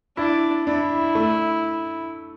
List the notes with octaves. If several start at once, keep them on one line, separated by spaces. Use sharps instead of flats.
D4 E4
D4 E4
A3